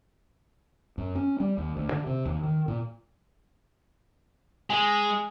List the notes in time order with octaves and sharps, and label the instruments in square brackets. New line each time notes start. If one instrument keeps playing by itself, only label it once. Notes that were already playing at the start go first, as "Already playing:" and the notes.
[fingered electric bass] F#2
C#4
G3
D#2
D2
D3
C3
D#2
D#3
A#2
[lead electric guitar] G#3 [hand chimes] G#5